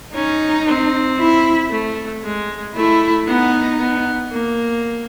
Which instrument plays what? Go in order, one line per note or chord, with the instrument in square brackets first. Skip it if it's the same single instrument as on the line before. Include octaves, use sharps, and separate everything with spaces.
[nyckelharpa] C#4 [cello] D#4
[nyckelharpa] C4
[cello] E4
[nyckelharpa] A3
G#3
[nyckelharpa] A3 [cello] E4
[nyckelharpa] B3 [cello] D#4
[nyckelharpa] B3
A#3